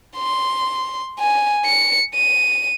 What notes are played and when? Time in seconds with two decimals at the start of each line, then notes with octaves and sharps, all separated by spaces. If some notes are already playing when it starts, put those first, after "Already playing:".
0.17 C6
1.20 G#5
1.65 C#7
2.14 D#7